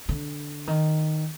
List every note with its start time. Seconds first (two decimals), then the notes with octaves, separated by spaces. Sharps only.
0.09 D3
0.67 D#3